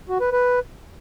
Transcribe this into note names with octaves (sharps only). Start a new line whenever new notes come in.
F#4
B4
B4